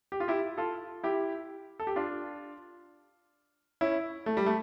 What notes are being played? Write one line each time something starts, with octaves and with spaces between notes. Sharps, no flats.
G4
F4
E4 G4
F4 A4
E4 G4
A4
G4
D4 F4
C#4 E4
A3
G3
A3